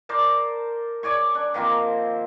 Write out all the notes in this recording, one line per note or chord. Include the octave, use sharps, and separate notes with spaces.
A#4 C5 D5 A5
C#5 D5 G#5 C#6
D4
D#3 F3 A#3 C4